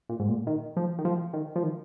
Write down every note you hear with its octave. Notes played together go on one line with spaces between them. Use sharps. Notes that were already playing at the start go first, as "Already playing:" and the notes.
A#2
G#2
A#2
D#3
F3
D#3
F3
D#3
F3
D#3